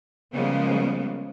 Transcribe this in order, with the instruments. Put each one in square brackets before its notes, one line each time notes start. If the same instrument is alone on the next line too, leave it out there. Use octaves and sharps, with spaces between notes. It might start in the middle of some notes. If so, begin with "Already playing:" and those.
[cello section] C#3 F3 G3 G#3 A#3 B3